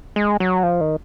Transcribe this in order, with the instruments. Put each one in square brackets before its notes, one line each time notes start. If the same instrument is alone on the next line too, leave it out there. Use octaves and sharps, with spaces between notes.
[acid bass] G#3
F#3
F3
D#3